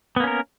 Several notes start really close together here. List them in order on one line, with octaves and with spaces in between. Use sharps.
B3 A#3 C#4 A#4